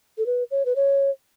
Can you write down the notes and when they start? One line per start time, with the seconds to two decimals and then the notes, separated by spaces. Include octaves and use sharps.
0.18 A4
0.26 B4
0.51 C#5
0.65 B4
0.76 C#5